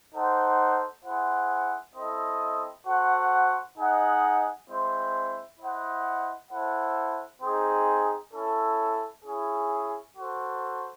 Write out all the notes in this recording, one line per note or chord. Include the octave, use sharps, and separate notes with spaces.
D#4 A4 C5 F#5
E4 G#4 C5 F#5
C4 E4 A4 D#5
F#4 A4 C5 F#5
D#4 G#4 D#5 F#5
G#3 C4 E4 C5
E4 C5 D#5 F#5
E4 A4 C5 F#5
C4 D#4 G#4
C#4 E4 A4
C#4 E4 G#4
F#4 A4 C5